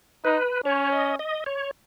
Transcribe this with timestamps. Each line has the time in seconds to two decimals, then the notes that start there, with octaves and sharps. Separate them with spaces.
0.24 D#4 B4
0.65 C#4 C#5
0.92 D#5
1.19 D#5
1.46 C#5